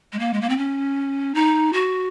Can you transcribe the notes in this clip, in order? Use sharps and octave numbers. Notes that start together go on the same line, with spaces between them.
G#3
A#3
G#3
A#3
C4
C#4
D#4
F#4